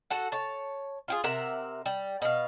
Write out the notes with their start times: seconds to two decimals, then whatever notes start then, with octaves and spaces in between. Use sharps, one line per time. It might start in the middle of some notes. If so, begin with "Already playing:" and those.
0.10 F#4 A4 F#5
0.32 C#5 A5
1.08 F4 G4 G#4
1.24 C3 A#4 E5 F#5
1.86 G3
2.22 B2 F5